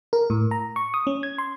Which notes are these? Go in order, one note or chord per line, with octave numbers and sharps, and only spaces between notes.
A#4
A2
A#5
C#6
D#6
C#4
G#6
C6